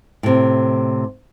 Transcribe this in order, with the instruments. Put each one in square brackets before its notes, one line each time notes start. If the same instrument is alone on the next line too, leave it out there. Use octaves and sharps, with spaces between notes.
[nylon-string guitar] A2 C3